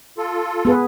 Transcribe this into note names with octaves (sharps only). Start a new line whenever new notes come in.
F4 A4
B3 G#4 B4